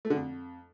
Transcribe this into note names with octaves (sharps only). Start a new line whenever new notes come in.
A3
D3
F2